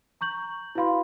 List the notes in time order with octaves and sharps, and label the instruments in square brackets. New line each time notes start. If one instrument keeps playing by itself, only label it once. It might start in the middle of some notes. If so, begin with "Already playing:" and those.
[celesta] A#5 C#6 G6 F#7
E4 F#4 B4 F5 B5 C6